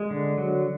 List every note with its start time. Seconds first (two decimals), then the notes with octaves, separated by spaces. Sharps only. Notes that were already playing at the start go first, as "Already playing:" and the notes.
Already playing: G#3
0.11 D3
0.37 F#3